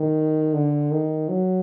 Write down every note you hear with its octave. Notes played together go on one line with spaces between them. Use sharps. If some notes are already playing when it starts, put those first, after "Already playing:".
Already playing: D#3
D3
D#3
F#3